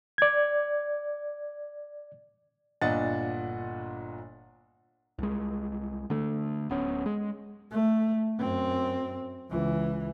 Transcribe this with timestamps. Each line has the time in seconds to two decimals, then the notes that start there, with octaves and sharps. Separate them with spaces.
0.18 D5 G#6
2.81 G1 A#2 D4 D#5 F#5 A6
5.19 C2 G#3
6.10 D3 A3
6.70 D1 B3 C#4
7.06 G#3
7.71 A3
8.39 F#2 C4
9.50 C#2 E3